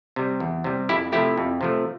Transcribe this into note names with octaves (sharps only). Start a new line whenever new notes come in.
C3 G3
E2
C3 G3
F2 E4 G4
C3 F3 A3 E4 G4
F2
C3 F3 A3